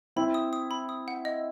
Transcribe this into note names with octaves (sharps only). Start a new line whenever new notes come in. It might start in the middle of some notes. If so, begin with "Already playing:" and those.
C4 E4 B5
D#6
D#6
B5
D#6
F#5
D#5